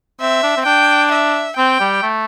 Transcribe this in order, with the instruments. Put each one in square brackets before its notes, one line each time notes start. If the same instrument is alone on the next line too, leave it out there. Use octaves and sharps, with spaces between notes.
[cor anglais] C4 [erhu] E5
[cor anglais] D4
C4
[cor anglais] D4 [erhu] G5
[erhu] E5
[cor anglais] C4 [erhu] G5
[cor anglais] G3
A3